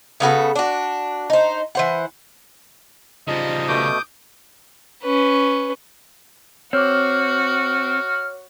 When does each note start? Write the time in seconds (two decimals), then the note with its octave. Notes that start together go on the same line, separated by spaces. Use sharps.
0.20 C#3 B3 F#4 A4
0.56 D4 F#4
1.30 D#4 C5
1.75 E3 C5 F#5
3.27 C#3 F3 G3 D#4 D#5
3.68 B2 A3 D6 D#6 G6
5.03 C#4 B4
6.73 C4 F#4 C#5 D6 F6